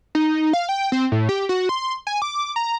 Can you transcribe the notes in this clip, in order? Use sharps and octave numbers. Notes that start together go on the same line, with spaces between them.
D#4
F5
G5
C4
A2
G4
F#4
C6
G#5
D6
A#5